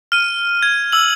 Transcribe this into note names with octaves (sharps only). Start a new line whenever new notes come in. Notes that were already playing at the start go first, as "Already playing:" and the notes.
F6 D#7
G#6
E6 F#7